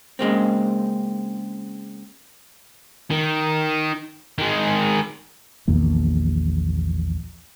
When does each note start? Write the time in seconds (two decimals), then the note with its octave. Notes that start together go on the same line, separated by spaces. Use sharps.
0.19 C#3 G#3 A#3 C4
3.10 D#3
4.39 D#3 G#3
5.68 A#1 E2 D#3 A#3